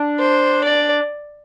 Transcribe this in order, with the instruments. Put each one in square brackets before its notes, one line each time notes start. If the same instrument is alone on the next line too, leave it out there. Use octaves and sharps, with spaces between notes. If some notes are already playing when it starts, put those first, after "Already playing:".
Already playing: [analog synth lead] D4
[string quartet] C5
D5